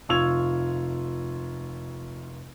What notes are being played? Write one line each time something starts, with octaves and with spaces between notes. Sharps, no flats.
F1 F4 C#6 E6 G#6 F7